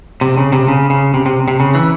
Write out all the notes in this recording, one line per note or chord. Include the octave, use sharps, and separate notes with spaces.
C3
C#3
C3
C#3
C#3
C3
C3
C3
C#3
E3